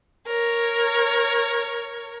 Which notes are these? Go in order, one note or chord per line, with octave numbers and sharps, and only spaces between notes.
A#4 C#5